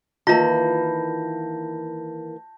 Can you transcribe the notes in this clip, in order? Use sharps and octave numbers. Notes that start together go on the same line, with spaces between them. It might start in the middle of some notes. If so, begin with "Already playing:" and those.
D#3 E3 A#3 E4 F4 A5 G6 A#6